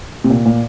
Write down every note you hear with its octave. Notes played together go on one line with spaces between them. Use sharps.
C3
A#2
A#2